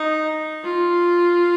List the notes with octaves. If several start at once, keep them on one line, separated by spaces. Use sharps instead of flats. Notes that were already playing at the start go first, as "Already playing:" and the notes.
Already playing: D#4
F4